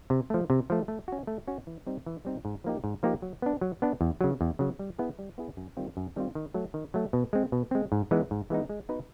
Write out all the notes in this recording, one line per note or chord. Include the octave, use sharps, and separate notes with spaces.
C3
F3 A3
C3
F3 A3
A3
C#4 F#4
A3
C#4 F#4
E3
G3 C4 D#4
E3
G3 C4 D#4
G#2
F3 A#3 D#4 G4
G#2
F3 A#3 D#4 G4
F#3
B3 D4
F#3
B3 D4
E2
C#3 F#3
E2
C#3 F#3
G3
B3 E4 G#4
G3
B3 E4 G#4
F#2
D#3 G3 C4 F4
F#2
D#3 G3 C4 F4
D#3
F#3 A3
D#3
F#3 A3
B2
G#3 C4
B2
G#3 C4
G#2
E3 G#3 B3 D#4
G#2
E3 G#3 B3 D#4
G#3
B3 D#4 F#4 B4